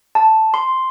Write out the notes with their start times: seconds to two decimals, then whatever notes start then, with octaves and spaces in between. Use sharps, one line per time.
0.15 A5
0.54 C6